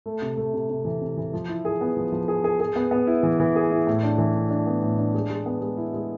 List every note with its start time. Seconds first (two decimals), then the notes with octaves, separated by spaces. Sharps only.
0.06 A3
0.22 C3
0.37 A3
0.54 C3
0.70 C3
0.85 E3
1.01 C3
1.17 E3
1.33 F3
1.49 E4
1.65 G#4
1.81 B3
1.97 F3
2.12 F3
2.28 G#4
2.44 G#4
2.60 G#4
2.76 B3
2.91 B3
3.07 E4
3.23 E3
3.40 E3
3.56 G#4
3.71 E4
3.87 A2
4.03 D4
4.18 E3
4.35 D4
4.50 D4
4.67 B3
4.82 A2
4.98 D4
5.15 G#3
5.30 G#3
5.46 B3
5.62 G#3
5.77 E4
5.94 G#3